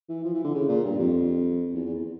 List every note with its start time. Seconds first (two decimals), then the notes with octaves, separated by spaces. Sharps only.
0.09 E3
0.24 F3
0.34 E3
0.44 D3
0.55 C#3
0.69 A#2
0.84 G2
0.99 F2
1.74 E2
1.85 E2